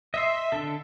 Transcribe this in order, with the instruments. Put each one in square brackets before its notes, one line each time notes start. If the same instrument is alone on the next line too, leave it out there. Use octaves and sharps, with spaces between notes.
[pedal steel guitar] D#5 C6 [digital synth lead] E5
[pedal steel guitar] D3 D4 A4